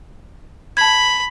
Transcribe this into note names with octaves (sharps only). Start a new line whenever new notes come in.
A5 B5 G#6